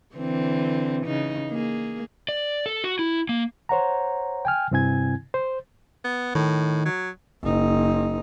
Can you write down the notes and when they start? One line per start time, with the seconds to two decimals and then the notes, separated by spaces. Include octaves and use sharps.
0.15 D3 E3 C4
1.06 C#3 D#4
1.51 A#3 G#4
2.29 D5
2.66 A4
2.84 F#4
2.99 E4
3.29 A#3
3.69 C5 C#5 F#5 A#5
4.45 G5 G#5 F6
4.71 G2 C3 C4 E4 G#5 G#6
5.34 C5
6.04 B3
6.35 A2 D#3
6.85 F#3
7.43 F#1 D#4